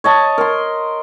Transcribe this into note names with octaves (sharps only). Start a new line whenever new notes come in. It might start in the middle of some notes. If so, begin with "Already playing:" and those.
C#5 D#5 A5
A#4 C6